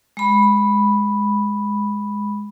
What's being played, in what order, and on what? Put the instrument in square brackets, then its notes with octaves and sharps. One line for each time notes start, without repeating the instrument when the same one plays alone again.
[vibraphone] G#3 B5